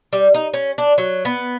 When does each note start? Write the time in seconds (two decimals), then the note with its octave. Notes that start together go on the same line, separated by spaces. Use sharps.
0.13 G3
0.34 D#4
0.54 C#4
0.78 D4
0.98 F#3
1.25 B3